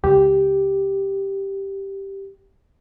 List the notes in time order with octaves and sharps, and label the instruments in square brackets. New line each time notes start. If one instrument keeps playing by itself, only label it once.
[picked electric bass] C#2 [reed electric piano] G4